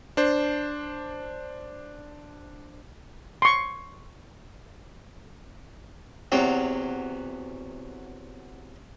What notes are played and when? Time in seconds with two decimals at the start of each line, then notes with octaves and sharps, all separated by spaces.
0.17 D4 C5
3.42 C6 C#6
6.32 E2 C3 F#3